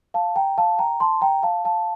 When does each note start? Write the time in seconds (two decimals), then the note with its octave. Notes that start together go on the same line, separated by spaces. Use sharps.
0.14 F5 A5
0.36 G5 A#5
0.58 F5 A5
0.78 G5 A#5
1.00 A5 C6
1.21 G5 A#5
1.43 F5 A5
1.65 F5 A5